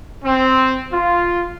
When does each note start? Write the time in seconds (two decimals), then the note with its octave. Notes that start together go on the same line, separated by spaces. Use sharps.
0.25 C4
0.93 F4